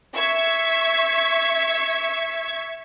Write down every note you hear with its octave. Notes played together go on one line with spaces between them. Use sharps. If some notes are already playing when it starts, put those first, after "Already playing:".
E5 C#6 G#6